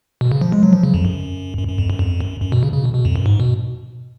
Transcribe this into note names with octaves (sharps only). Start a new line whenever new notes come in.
B2
C#3
F3
G#3
F#3
F3
C#3
F2
F#2
F#2
F#2
F2
F#2
F2
F#2
F#2
B2
C#3
C#3
B2
B2
F2
F#2
G#2
B2